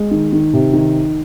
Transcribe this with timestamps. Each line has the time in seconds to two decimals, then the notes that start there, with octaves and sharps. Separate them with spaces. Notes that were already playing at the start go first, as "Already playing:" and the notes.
Already playing: G#3
0.11 D#3
0.33 D#3
0.53 C3
0.74 D#3